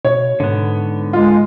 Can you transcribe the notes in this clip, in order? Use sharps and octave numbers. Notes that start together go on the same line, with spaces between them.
B2 C#5
G#2 D3 B3
G#3 F4